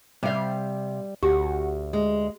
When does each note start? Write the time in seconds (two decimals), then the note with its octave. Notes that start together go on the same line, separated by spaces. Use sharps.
0.23 C3 G3 C5 D5 F5
1.23 D2 F#4 G4
1.93 G#3